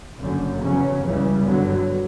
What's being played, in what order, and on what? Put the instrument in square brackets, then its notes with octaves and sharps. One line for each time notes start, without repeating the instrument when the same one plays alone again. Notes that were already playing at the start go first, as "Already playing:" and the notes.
[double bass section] F#1 F#2 D3
E2 C#3 F#3 C#4
C#2 C#3 E3 G3
G2 D3 F#3 B3